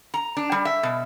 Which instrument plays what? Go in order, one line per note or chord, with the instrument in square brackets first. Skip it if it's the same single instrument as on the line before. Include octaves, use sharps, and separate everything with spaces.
[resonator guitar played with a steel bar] A#5
D4
G3
E5
B2